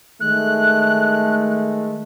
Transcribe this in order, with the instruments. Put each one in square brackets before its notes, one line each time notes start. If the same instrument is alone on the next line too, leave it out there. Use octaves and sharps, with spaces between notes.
[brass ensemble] D#3 G#3 A3 [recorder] F#6